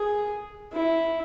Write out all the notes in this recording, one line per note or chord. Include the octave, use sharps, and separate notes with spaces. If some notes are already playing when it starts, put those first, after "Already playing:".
Already playing: G#4
E4